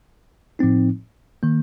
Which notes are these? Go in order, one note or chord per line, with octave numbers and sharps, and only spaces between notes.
A2 F3 C4 D#4
D#3 A#3